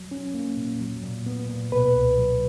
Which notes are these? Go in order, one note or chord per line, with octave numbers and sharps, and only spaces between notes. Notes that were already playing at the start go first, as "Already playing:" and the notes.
Already playing: F#3
C#4
A#3
A#2
F#3
A#2
B3
A#2
B2 B4
C#2
F#3